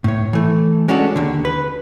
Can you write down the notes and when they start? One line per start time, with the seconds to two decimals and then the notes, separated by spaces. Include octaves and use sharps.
0.04 A2 C#5
0.33 E3 A3
0.88 G#3 C#4 D4 F#4 A4
1.16 D#2 D3
1.45 B4